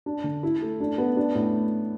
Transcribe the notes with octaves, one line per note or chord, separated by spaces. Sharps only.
D4
D3
E4
A3
D4
B3
D4
A2